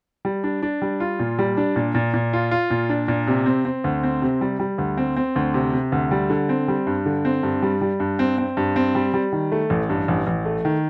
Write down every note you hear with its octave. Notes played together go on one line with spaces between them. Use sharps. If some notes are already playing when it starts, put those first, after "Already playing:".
G3
D4
D4
G3
F4
A#2
G3
D4
A#2
A#2
A#2
F4
F4
A#2
D4
A#2
C3
C4
C4
D2
C4
C3
G3
G3
D2
C4
C4
D2
C3
C3
D2
G3
D3
C4
G3
G2
D3
C4
G2
G3
G3
G2
C4
C4
G2
C4
G3
G3
D#3
A3
A1
G2
A1
A1
A3
D#3